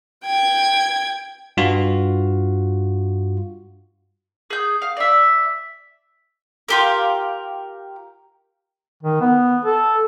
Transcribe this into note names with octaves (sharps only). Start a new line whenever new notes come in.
G5 G#6
G2 F4 F#4
G#4 G6
F5
D5 E5
F4 G4 A#4
D#3
B3
A4